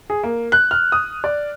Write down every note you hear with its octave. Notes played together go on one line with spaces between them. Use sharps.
G#4
A#3
F#6
F6
D#6
D5